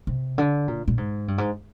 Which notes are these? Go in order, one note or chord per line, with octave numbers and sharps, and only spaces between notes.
C3
D3
A#2
A#2
G#2
G2
G#2